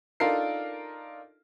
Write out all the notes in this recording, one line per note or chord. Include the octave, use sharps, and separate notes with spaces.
D4 D#4 F4 A4 A#4 C7